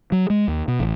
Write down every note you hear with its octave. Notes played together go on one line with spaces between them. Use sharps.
F#3
G#3
D#2
B2
A1